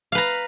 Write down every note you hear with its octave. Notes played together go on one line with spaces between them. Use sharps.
B4 F5 A#5